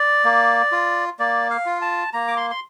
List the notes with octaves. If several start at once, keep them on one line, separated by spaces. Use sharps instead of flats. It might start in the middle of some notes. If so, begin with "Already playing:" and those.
Already playing: D5
A#3
F4
A#3 D5
F5
F4
A5
A#3 A#5
D6
C6
C6